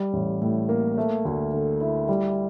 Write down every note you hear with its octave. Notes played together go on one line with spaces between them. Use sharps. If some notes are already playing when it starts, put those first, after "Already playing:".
Already playing: G3
A1
A2
A#3
A3
D2
D3
E4
G3